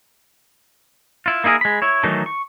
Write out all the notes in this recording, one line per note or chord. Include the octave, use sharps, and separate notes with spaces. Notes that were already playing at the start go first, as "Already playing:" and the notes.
E4 F4
A#3 D#4 E4 G#4 A#4
G#3 B5
E4 C#5
D#3 E3 F#3 A3 D#4
C#6